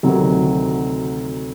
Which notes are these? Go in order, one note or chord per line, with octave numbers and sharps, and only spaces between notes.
D2 C3 D#3 F#3